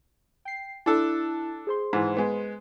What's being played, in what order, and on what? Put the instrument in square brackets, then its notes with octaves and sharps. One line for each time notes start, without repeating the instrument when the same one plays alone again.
[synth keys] G5 C7
[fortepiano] D4 A4 [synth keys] E4 E6 F#6
[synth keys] G#4 C5 C6
[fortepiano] G#2 E3
G#3 B3